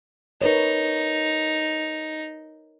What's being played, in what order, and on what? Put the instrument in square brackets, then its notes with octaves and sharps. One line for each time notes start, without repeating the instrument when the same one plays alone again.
[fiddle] D#4 [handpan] A#4 B4 C#5